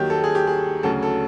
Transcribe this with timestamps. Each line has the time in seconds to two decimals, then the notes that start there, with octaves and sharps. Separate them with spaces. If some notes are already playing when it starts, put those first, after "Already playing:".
Already playing: D#2 D#3 F#3 G4
0.10 A4
0.24 G#4
0.35 G4
0.47 G#4
0.83 D2 C#3 F#3 A4
1.03 A4